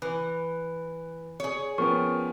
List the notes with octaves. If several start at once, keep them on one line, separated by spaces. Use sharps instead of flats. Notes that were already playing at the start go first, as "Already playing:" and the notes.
E3 B4
G#4 C#5
F3 B3 C#4 A#4 G5 C#6